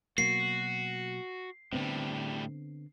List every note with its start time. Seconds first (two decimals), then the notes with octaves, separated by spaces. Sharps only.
0.18 B2 F#3 A#3 F#4 C7
1.73 A2 D3 G3 B3 C4